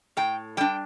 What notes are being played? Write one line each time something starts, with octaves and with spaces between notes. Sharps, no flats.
A2 G5
G3 D4 G5